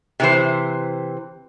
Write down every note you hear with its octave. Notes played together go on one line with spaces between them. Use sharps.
C3 E3 C5